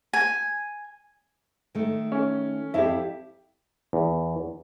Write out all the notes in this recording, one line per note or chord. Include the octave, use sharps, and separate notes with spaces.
G#5
D#3 A3
C#4
F2 E4 G4 E5 F5
E2